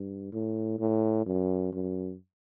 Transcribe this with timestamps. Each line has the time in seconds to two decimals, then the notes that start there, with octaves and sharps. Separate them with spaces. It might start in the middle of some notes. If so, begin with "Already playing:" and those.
Already playing: G2
0.32 A2
0.79 A2
1.26 F#2
1.72 F#2